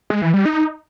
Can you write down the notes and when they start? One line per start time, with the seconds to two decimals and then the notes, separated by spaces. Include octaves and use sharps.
0.10 G#3
0.22 E3
0.34 G3
0.45 D#4